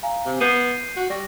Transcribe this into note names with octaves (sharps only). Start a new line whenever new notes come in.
F5 G#5 A#5
C3
B3 G6 C7 D#7
F#4
G3 C#6 A#6